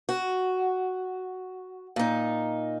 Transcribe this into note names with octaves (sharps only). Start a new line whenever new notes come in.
F#4
A#2 D#4